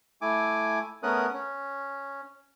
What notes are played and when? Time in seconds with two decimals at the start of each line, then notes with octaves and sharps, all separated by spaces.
0.22 A3 E4 G#5 D6
1.03 A3 B3 C#4 A#4 D#6 F#6
1.33 C#4